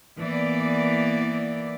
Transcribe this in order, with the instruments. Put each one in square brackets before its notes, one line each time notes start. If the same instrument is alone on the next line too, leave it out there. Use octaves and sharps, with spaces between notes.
[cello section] E3 A#3 B3 D5